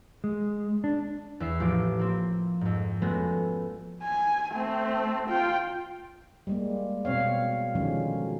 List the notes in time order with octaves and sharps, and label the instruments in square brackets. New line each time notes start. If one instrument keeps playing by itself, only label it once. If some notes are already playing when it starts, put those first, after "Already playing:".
[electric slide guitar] G#3
D4
[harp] E2 E5 C7
A1 F3 D6
A#3 C4
F2 G#2
G#3 A3 B3 C#4 F#4 G#4
[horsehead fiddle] G#5
A3 C4
F4 G5
[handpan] G3 G#3 A#3
B2 C4 C#5 F5
D3 D#3 F3 F#3 G#3 C#4